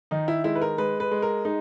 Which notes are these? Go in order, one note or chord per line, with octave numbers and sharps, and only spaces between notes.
D#3 D#4
E4
G#3 E4
B4
A#4
G#3 B4
B4
G#3
A#4
G#3 D#4